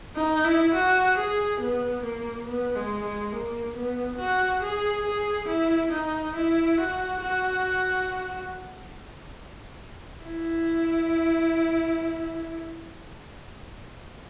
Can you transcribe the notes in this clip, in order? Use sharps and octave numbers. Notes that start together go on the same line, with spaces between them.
D#4
E4
F#4
G#4
B3
A#3
B3
G#3
G#3
A#3
B3
F#4
G#4
G#4
E4
D#4
E4
F#4
F#4
E4